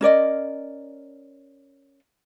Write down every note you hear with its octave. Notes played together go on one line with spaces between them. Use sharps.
C#4 A#4 D5 D#5